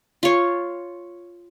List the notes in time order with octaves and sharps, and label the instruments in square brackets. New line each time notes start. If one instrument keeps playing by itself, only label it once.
[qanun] F4 C#5